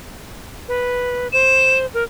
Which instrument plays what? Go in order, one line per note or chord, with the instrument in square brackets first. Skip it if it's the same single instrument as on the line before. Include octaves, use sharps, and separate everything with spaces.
[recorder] B4
[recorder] C5 [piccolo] E7
[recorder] A#4